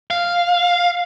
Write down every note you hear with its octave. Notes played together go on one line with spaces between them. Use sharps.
F5